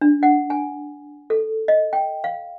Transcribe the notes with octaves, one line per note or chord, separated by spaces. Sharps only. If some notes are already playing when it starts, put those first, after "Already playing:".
D4
F#5
G#5
A4
D#5
G5
F5